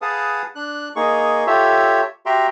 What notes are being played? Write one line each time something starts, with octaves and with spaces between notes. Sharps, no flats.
G#4 B4 F5 F#5 A5 D#6
D4 F#6
A#3 D#4 G#4 C#6
F4 G4 A4 C#5 E5
F#4 G4 E5 G5 A#5 C6